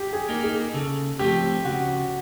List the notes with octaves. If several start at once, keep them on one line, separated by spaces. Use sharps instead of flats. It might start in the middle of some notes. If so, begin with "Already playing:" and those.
Already playing: G4
G#4
A#3 D#4
G#4
C#3 A4
F3 A3 C4 G4
C#3 F#4